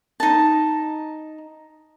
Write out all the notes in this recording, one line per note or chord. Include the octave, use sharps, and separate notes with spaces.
D#4 A5